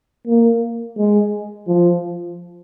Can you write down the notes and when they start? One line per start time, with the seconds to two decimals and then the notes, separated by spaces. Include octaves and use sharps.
0.27 A#3
0.98 G#3
1.67 F3